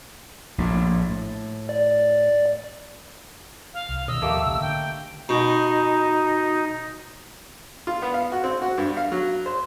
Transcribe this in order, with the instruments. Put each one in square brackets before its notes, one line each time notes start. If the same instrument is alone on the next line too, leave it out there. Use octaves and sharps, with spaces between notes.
[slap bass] A#1 A2
A2
[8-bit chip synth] D5
[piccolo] F5
[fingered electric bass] C2
[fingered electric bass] B2 D#3 [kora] D#5 [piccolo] E6
[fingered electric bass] D#2 A2 F3 [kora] A3 A#3 G4
[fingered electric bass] B1 C#3
[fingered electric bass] D3 [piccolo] G5
[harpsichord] B2 [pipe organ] D#4
[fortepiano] F4
B3
F5
F#4
C4
F#4
G2
F5
F#3
C5